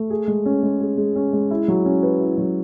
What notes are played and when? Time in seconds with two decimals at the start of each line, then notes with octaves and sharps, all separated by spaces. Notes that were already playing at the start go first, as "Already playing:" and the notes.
Already playing: A3
0.10 G#4
0.28 G#3
0.46 C#4
0.63 G#3
0.80 G#4
0.97 G#3
1.16 C#4
1.33 G#3
1.51 E4
1.68 F#3
1.85 C#4
2.03 B4
2.20 E4
2.38 F#3